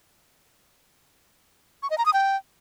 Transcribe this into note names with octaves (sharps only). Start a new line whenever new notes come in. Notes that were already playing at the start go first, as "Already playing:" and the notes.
C#6
D#5
A#5
D#6
G5